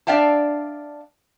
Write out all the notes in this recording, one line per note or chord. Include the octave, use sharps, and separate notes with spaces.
D4 D5 E5 F5 G5 A5